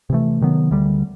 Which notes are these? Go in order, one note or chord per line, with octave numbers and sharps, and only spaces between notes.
C3 E3 A3
C3 D#3 F#3 B3
D2 D3 G3